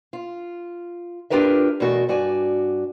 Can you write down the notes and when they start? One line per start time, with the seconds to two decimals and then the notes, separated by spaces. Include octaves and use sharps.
0.13 F4
1.30 D4 F4 G4 A#4 B4 E5
1.80 E2 B2 A3 F#4 A#4
2.09 G2 F#4 D5 G#5